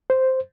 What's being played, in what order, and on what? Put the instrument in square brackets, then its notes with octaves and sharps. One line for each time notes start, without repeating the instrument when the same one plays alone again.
[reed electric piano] C5